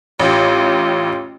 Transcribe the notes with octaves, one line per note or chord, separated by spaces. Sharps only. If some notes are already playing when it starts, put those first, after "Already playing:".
A1 F4 G4